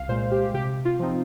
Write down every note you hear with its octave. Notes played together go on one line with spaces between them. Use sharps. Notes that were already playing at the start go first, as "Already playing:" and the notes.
Already playing: C2 F5
A#2 G#3 C5
G4
C3 G4
F4
F3 C4 D#4